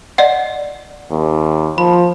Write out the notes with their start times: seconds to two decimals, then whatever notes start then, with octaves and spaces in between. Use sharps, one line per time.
0.18 D5 D#5 F#5
1.11 D#2
1.78 F3 B5